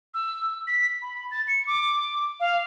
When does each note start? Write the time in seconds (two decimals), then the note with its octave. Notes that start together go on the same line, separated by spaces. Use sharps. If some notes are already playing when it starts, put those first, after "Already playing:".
0.14 E6
0.67 B6
1.02 B5
1.31 A6
1.48 C#7
1.67 D6
2.40 F5